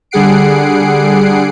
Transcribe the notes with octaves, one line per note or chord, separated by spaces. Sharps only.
D3 G3 G#4 F#5 C7 D7